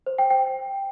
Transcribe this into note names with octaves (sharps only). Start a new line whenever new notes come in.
C5
G5
G5